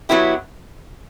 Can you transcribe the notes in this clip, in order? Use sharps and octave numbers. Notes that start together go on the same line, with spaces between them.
F#3 B3 E4 G4